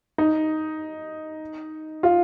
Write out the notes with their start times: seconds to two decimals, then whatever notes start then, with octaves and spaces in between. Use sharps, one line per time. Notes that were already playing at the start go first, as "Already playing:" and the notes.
0.18 D#4
2.03 F4